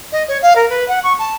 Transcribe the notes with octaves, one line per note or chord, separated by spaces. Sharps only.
D#5
C#5
F5
A#4
B4
F#5
C#6
A5